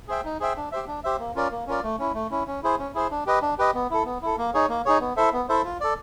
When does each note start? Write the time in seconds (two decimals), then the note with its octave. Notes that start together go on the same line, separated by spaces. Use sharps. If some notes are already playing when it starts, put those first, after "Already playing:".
0.08 G#4 C5 E5 G5
0.25 D#4
0.40 G#4 C5 E5 G5
0.57 D4
0.72 G4 C5 E5
0.88 D4
1.04 G4 C5 E5
1.19 A#3
1.36 C#4 F4 A#4 D5
1.52 A#3
1.67 C#4 F4 A#4 D5
1.83 A3
1.99 C#4 E4
2.15 A3
2.31 C#4 E4
2.47 C#4
2.63 E4 G#4 C5
2.79 C#4
2.94 E4 G#4 C5
3.11 D4
3.26 G4 B4 D#5
3.42 D4
3.59 G4 B4 D#5
3.75 B3
3.90 E4 A4
4.05 B3
4.22 E4 A4
4.38 A#3
4.54 D#4 G#4 C#5
4.69 A#3
4.86 D#4 G#4 C#5
5.01 B3
5.17 E4 A4 C5 E5
5.33 B3
5.49 E4 A4 C5 E5
5.65 F4
5.81 A4 D5